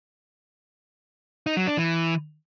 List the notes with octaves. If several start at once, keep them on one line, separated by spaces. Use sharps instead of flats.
D#4
F#3
D4
E3